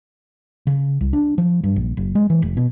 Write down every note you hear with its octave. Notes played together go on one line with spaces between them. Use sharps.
C#3
C2
D4
F3
G2
A#1
F#1
G#3
E3
F1
B2